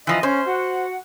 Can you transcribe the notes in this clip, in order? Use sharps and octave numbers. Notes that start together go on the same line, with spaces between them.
E3 F3 D#5
C#4 C5
F#4 F#5